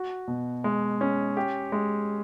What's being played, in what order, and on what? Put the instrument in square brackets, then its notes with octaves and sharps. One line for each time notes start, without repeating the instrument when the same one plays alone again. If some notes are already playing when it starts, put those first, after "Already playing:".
Already playing: [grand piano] F#4
B2
G#3
C#4
G4
G#3